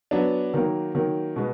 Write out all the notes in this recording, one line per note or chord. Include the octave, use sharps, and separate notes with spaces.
F#3 B3 D4
D#3 F#3 A#3
D#3 F#3 A#3
B2 G#3 B3